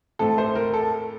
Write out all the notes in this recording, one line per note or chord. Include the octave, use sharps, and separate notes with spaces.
A2 A3 C4 A4
C5
A#4
A4